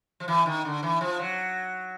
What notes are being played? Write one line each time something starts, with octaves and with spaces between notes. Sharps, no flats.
F3
E3
D#3
D3
E3
F3
F#3